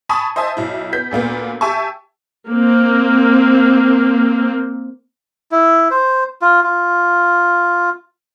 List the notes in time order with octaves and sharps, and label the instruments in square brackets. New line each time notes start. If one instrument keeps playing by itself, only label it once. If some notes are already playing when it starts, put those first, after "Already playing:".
[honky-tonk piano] G#5 A5 B5 C#6 D#6
C5 D#5 E5 G#5 A5
B1 E4
B3 G6 B6
D2 A#2 A#3 B3
G4 E5 G#5 A5 C#6
[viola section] A#3 C4
[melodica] E4
C5
F4
F4